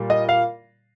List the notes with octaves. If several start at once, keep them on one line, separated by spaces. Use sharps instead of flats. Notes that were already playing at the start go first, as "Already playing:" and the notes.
Already playing: A#2 G3
D#5
F5